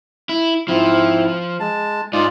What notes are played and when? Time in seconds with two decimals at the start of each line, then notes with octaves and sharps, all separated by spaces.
0.29 E4
0.68 G#2 F3 C4 E4
1.60 G#3 A5
2.13 G#2 D#4 F4 D5